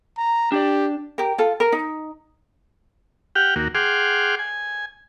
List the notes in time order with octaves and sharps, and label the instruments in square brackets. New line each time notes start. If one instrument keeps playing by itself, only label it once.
[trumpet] A#5
[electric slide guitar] D4 D5 [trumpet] G4
[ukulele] G4 A#4
F4 A4
A#4
D#4
[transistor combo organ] G4 F#5 G5 F6
D#2 A#3 F#4
G#4 F#5 G5 C6 D6 F6
G#5